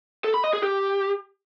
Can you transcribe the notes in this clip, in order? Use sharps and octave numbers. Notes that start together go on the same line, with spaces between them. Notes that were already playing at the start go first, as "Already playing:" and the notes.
A4
B5
D#5
G#4
G4